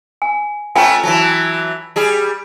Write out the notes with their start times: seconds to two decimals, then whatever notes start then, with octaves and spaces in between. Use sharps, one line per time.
0.22 G#5
0.75 A3 B3 C#4 F4 G5 G#5
1.03 E3 F#3 A5
1.96 G3 G#4